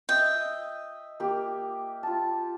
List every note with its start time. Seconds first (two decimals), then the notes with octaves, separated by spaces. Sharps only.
0.09 D#5 E5 G5
1.20 A#3 G4
2.03 F4 A5